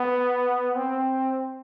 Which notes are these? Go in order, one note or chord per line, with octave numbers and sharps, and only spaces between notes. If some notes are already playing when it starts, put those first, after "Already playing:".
Already playing: B3
C4